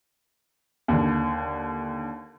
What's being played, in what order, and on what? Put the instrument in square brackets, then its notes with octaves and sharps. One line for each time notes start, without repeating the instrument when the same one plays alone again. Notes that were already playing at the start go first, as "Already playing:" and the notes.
[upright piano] D#2 D3